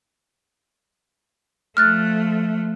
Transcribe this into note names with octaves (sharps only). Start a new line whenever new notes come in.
F3 A3 F6 F#6 A6